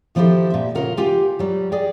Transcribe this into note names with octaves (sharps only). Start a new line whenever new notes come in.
D#3 F3 C4 E4 G4 A4
A#2 E5
C#3 F4 A#4 F#5
F4 G4 G5 G#5
F#3 G3
G#4 D5 D#5 G5